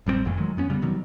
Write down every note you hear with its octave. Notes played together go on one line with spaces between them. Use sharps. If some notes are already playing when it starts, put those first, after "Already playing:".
A1 G3 A3 C4
F#1 F2 E3 A3
D#3 F#3 G#3
F2 B3 C#4
C#3 G3 B3
B2 D#3 F#3 G3